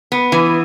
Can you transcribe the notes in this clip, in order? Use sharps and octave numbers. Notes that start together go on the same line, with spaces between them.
B3
E3